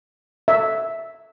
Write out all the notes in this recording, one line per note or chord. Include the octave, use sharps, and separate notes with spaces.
E5